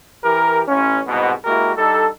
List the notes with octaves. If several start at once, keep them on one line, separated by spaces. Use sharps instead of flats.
E3 G4 A#4
A1 C#4
C2 G#2 B2
G#3 A#3 E4 F#4 G4 A#4
G3 D4 D#4 A4